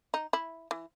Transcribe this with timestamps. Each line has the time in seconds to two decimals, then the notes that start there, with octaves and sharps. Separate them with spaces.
0.14 D#4
0.33 E4
0.71 E3